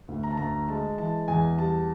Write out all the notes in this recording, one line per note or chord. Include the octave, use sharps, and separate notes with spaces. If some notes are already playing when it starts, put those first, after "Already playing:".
D2
A#5
A5
D2 A#5
G#3 A5
E3 A5
E2 G#5
G3 A5